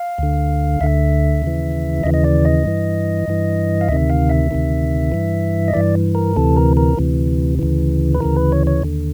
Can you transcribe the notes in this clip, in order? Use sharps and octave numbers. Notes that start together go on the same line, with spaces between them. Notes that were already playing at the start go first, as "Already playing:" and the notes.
Already playing: F5
D2 D3
D2 D3 E5
D#2 C#3 E3
D#2 C#3 E3 D#5
D#5
D5
D#5
G2 E3
G2 E3
F5
D2 C3 D#3 E5
F5
E5
D2 C3 D#3
G2 E3
D#5
G2 E3 D5
A#4
D2 C3 E3 A4
A#4
A#4
D2 C3 E3
D2 C#3 E3
B4
D2 C#3 E3 A#4
B4
C#5
C#5
D#2 D3